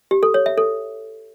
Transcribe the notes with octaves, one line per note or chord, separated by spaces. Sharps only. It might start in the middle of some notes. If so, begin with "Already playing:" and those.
G4
A4
C#5
E5
A4